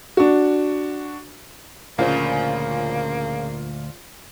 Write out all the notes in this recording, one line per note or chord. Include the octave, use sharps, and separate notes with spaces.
D4 F#4
D2 A#2 C#3 F3 A#3 F4 C5 D5